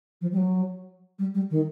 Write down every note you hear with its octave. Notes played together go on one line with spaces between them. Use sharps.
F3
G3
F#3
G3
G3
D#3